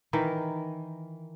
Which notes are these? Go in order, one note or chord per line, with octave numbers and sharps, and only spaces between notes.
D#3 E3 A#4